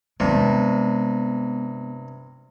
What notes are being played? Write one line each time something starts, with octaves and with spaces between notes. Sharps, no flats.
G2 C3 G#3 B3